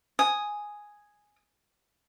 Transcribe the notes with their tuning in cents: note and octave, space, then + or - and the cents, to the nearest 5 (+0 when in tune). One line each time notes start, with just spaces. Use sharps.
G#5 +0 D#6 +0